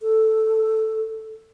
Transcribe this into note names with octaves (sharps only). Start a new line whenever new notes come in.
A4